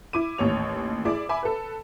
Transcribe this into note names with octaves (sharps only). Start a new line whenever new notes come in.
E4 D6 D#7
A1 D#2 C#5 F7
E4 G#4 D5 D6
E5 G#5 B5 D6
A4 B4